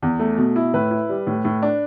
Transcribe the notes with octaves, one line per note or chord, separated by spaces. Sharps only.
E2
A3
B2
E4
A2 B4
E4
G3
A2
A2
D4